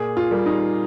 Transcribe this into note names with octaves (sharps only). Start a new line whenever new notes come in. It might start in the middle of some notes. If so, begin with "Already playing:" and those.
Already playing: A#2 G#4
F4
G3 A#3
D#4